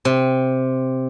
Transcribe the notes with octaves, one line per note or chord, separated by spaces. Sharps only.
C3